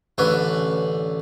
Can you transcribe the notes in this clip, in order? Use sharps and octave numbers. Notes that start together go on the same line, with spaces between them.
A1 D3 C#4 B4